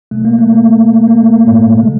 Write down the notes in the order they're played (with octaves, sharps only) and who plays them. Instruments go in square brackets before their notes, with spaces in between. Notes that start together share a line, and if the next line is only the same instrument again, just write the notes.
[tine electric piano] B2 F#3 A3
A#3
A3
A#3
A3
A#3
A3
A#3
A3
A#3
A2 A3
G3
C#3 F3 G#3